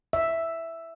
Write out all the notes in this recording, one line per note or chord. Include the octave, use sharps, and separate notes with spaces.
E5